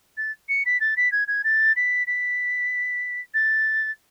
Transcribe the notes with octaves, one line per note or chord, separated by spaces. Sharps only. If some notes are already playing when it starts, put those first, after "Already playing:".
A6
C#7
B6
A6
B6
G#6
G#6
A6
B6
B6
A6